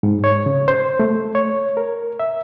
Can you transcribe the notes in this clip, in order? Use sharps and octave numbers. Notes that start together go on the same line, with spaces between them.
G#2
C#5
C#3
C5
A3
C#5
A#4
E5